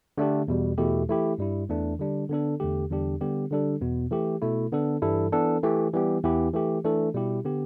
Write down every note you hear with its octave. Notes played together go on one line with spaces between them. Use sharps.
D3 A3 D4 G4
E2 B2 G3
E2 B2 A3 E4 G4
E3 A3 E4 G4
G2 G3 E4
E2 E3 A3 D4
D3 G3 D4
D3 B3 D4 A4
E2 D3 A3 G4
E2 D3 G3 D4 G4
D3 G3 B3 G4
D3 G3 D4 A4
E2 B2 B3
E3 A3 G4
B2 A3 E4
D3 B3 D4 A4
G2 E3 G3 E4 A4
E3 B3 D4 A4
E3 A3 G4
E3 G3 B3 G4
E2 E3 B3 E4 G4
E3 A3 G4
E3 A3 D4 A4
B2 G3 E4 G4
D3 B3 G4